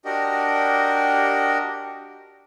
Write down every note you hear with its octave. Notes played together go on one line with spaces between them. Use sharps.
D4 F#4 G4 A#4 D#5